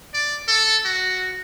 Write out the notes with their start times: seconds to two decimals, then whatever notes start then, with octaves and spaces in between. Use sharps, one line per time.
0.14 D5
0.48 A4
0.85 F#4